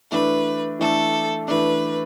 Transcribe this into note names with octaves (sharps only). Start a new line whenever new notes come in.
E3 A3 D4 B4
E3 A3 D4 A4
E3 A3 D4 B4